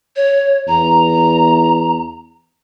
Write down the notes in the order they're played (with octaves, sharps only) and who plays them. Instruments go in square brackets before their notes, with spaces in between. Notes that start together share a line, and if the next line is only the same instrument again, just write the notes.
[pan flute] C#5
[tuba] E2 [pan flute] A#5